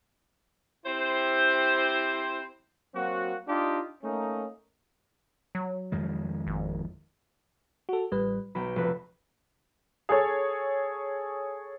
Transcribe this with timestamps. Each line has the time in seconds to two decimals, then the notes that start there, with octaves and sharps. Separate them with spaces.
0.86 C4 E4 G4 C5
2.95 F#3 A#3 C4 F#4
3.48 D4 D#4 F4 G4 D#5
4.04 A3 A#3 C#4 D#4
5.55 F#3
5.92 F2 D#3 G#3
6.47 G#1
7.89 F#4 A4
8.11 A1 G3 B4
8.55 B1 G5 B5
8.76 F1 B4
10.09 G#4 A4 C#5